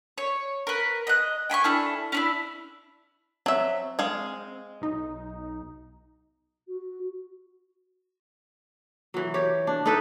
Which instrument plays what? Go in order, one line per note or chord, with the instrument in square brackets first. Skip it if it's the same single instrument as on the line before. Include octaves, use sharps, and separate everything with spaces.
[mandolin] C#5
A#4 B4
D#5 F#6
G5 G#5 B5 C#6
D4 E4 A4 F6
C#4 D4 E4
[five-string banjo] F#3 E5 [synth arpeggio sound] C4
[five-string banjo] G#3 F5
[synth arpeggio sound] B1 D#4
[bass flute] F#4
[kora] E3 F#3
G4 C#5
D4
D#4 E4 A4 B4